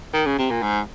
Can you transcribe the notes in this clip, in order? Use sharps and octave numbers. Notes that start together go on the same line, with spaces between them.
D#3
C#3
C3
A#2
G#2